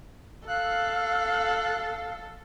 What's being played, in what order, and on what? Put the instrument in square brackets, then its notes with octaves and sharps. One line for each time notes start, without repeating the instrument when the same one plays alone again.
[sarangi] A4 [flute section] F5 E6 [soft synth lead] F#6